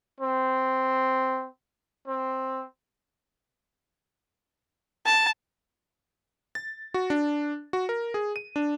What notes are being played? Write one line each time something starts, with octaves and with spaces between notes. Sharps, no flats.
C4
C4
A5
A6
F#4
D4
F#4
A#4
G#4
D#7
D4